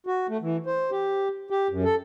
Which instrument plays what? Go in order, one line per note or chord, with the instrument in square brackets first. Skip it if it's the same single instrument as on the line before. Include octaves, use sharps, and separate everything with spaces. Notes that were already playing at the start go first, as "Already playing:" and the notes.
[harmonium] F#4
A3
E3
C5
G4
G4
F#2
A4